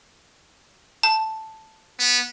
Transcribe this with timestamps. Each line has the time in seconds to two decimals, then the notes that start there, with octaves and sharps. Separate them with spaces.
1.03 A5
1.99 B3